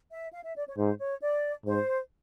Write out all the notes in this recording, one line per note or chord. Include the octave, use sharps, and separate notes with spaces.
E5
F5
E5
D5
C#5
G#2 C5
C#5
D5
G#2 C5